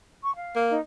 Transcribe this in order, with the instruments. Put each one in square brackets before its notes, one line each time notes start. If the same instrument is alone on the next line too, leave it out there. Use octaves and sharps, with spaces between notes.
[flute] C#6
F5
[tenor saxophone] A#3
[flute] D#4